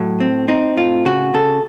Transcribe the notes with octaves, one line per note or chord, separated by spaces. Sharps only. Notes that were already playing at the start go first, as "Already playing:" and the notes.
Already playing: A2 F#3
C4
C4 D#4
A2 F4
C#3 F#4
C#3 A4